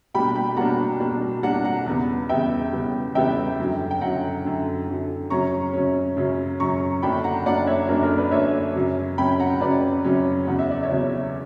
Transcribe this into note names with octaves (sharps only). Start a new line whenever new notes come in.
B2 G3 A#3 D4 G5 B5
G5 B5
B2 G3 A#3 D4 F#5 A#5
B2 G3 A#3 D4
B2 G3 A#3 D4 F#5 A#5
F#5 A#5
E2 C#3 G3 B3
E2 C#3 G3 B3 E5 G5
E2 C#3 G3 B3
E2 C#3 G3 B3 E5 G5
F#2 D3 F#3
G5
F#2 D3 F#3 F#5 A#5
F#2 D3 F#3
F#2 D3 F#3
F#2 C#3 F#3 C#4 A#5 C#6
F#2 C#3 F#3 C#4
F#2 C#3 F#3 C#4
F#2 C#3 F#3 C#4 A#5 C#6
F#2 D3 A#3 D4 G5 B5
F#5 A#5
F#2 D3 A#3 D4 D5 F#5
C#5 E5
F#2 D3 A#3 D4 A#4
A#4
B4 D5
F#2 D3 A#3 D4 C#5 E5
F#2 C#3 F#3 C#4
F#2 C#3 F#3 C#4 G5 B5
F#5 A#5
F#2 C#3 F#3 C#4 B4 D5
F#2 C#3 F#3 C#4
E2 C#3 F#3 C#4 F#5
E5
D5
C#5 E5
E2 C#3 F#3 C#4